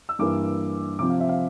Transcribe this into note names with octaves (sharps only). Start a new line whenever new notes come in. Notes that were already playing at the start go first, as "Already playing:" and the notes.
E6
G2 E3 A#3 D6
C3 F3 C4 D6
F5
E5
F5